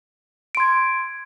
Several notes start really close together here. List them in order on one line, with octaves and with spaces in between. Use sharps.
D7 C6 G#6